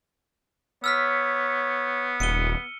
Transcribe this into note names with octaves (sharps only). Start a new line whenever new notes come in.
B3 C#5 E6 F6 B6
D#1 C#7 D#7 G7